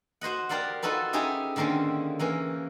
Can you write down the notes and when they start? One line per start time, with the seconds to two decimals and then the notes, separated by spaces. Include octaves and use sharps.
0.21 F#4 C5 D#5 F#5
0.49 G4 A#4 D5 F5 F#5
0.82 D#4 F4 F#4 A4 B4
1.13 C#4 D#4 G4 G#4 E5
1.56 D3 D#3 A#3 C4 C#4
2.19 E3 A#3 C#4